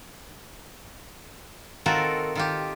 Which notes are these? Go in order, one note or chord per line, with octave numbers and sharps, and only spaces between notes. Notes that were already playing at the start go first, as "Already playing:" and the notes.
D#3 C4 F4 F#4 A4 A#4
D#3 F4 G4